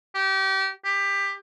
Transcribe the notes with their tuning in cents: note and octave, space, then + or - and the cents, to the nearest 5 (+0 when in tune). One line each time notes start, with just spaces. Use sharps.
G4 -30
G4 +20